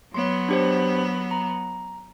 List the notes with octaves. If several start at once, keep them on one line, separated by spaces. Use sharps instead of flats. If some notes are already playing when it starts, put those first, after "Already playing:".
F#3 B3 C#5 C6
D4 G4 C5
A#5